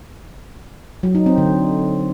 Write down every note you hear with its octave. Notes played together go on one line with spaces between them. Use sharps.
F#3
D#4
C4
D3